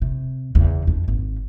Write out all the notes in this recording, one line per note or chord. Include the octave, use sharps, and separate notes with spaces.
C3
E2 C#3
F2 D4
G#1